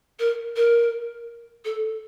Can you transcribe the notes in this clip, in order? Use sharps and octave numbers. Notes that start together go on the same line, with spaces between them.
A#4
A#4
A4